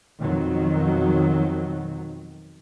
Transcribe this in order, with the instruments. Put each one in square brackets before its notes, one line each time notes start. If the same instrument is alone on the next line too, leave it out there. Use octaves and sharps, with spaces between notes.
[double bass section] F2 B2 D#3 F#3